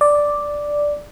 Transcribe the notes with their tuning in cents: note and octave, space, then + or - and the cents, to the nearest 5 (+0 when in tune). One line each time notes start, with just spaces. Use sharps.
D5 +0